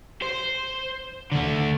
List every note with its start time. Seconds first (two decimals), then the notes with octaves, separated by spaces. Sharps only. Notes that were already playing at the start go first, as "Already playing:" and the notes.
0.22 C5
1.32 D3 A3